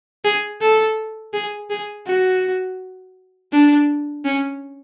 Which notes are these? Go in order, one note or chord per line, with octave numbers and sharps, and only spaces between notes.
G#4
A4
G#4
G#4
F#4
D4
C#4